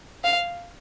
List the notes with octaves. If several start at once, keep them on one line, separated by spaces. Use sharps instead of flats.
F5